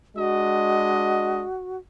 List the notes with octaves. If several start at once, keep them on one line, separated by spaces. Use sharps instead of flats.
G#3 D4 F#4 D#5